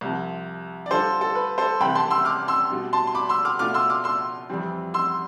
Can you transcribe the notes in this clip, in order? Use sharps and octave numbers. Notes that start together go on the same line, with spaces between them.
C2 C3 F3
D5
D3 G3 D4 F4 A4 C5
A4
B4
A4 C5
C2 C3 E3 G5 B5
A5 C6
C6 E6
D6 F6
C6 E6
B2 G3 D4
A5 C6
C6
B5 D6
C6 E6
D6 F6
B2 A3 D4 F4 D6 F6
C6 E6
D6 F6
C6 E6
F2 E3 G3 C4
C6 E6